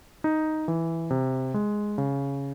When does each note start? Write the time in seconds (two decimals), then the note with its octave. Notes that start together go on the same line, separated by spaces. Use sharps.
0.24 D#4
0.68 E3
1.10 C3
1.54 G#3
1.98 C#3